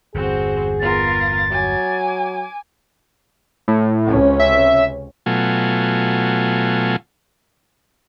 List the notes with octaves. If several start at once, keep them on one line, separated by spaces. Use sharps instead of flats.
G1 E2 C4 F#4 G#4 C5
B3 F4 A#4 A6
F#3 G#5 D6
A2
C#2 C3 C#4
E5
B2 F#3 A3 F4 G#5